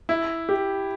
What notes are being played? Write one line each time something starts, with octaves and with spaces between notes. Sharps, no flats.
E4
G4